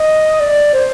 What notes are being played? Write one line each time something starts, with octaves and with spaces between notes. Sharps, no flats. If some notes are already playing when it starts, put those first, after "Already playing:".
Already playing: D#5
D5
C5